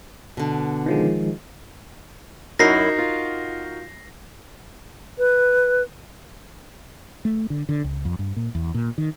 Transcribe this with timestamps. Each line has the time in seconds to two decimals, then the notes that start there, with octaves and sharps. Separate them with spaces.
0.37 B2 D3
0.86 D#3 F3 G#3
2.59 F#2 D#4 E4 F#4 A#4 A#6 C7
2.98 F4
5.19 B4
7.25 A3
7.50 D3
7.69 D3
7.84 C#2
8.05 F2
8.19 G2
8.36 A#2
8.55 E2
8.74 A#2
8.98 D#3